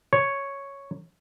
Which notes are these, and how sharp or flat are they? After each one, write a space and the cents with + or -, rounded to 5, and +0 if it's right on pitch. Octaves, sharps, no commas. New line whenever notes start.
C#5 +0